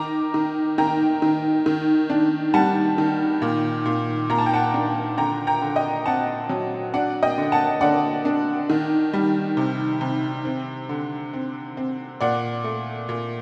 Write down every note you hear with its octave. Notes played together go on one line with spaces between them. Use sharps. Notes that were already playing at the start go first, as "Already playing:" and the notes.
Already playing: D#3 A#5 D6
D#3
D#3 G5 A#5
D#3
D#3
D4
G3 F#5 A5
D#3
A#2
A#2
A#2 A#5
A5
G5
F#5 A5
D4
D3 G5 A#5
G5 A#5
D3
D#5 G5
C4 F#5 A5
F#3
D4 D5 F#5
D#5 G5
D3
F#5 A5
D3 D5 F#5
D4
D#3
G3
C3
C3
C4
D3
C4
C4
A#2 D5 F#5
A3
A#2